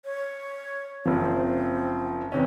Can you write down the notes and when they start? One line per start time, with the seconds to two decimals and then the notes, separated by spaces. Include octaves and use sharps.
0.05 C#5
1.06 F#1 F3 C4
2.32 E2 C3 C#4 D#4